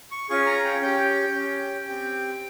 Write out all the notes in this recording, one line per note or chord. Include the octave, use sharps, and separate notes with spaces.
C#6
C#4 F4 G#4 C#6
A#5
G5
C#4 G4 G5
C#4 G4
C4 G4